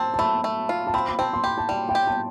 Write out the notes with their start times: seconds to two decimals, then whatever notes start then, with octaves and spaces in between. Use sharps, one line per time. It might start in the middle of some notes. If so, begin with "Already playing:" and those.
Already playing: C4 A5
0.14 A5
0.19 A3 B5
0.44 A3
0.69 F4
0.87 A5
0.94 C4 B5
1.09 B5
1.19 C4 A5
1.33 C6
1.44 G4 B5
1.58 A5
1.69 G3 G5
1.89 G5
1.95 G4
2.07 A5